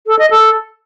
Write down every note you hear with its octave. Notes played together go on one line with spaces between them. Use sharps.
A4
D#5
A4